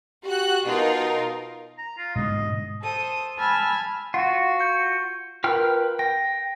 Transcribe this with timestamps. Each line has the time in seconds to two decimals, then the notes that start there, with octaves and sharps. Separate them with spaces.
0.24 F#4 G4 F#6
0.65 B2 D#4 F4 A#4
1.78 A#5
1.98 F4
2.16 G#2 B2 D3 D#5
2.82 A4 C5 D#6
3.38 G#5 A5 B5 E6 F6 G#6
4.14 F4 F#4 F#5
4.60 G6 C#7
5.44 F4 A#4 B4 G5 F6
5.99 G5 A#6